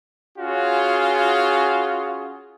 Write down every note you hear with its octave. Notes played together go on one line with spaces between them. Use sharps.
C#4 F4 F#4 G#4